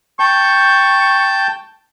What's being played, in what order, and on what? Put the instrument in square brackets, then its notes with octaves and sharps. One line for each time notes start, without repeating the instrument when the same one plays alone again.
[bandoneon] G5 A5 G6 [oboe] C#6